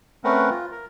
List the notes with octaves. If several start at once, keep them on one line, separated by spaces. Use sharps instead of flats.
A3 C4 C#4 A#4 B4 F#5
F4
A#4